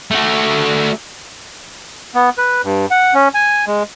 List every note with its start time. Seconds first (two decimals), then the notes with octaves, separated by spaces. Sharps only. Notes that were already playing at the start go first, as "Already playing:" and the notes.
0.11 A3 F#4
2.15 B3
2.38 B4
2.64 G2
2.91 F#5
3.14 C#4
3.34 G#5
3.67 G#3